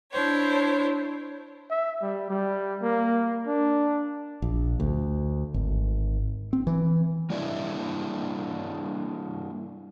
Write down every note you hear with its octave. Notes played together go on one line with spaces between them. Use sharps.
D4 E4 C5 C#5
E5
G3
G3
A#3
D4
A#1
D2
G#1
C4
E3
G3 A#3 D4 E4 D5 E5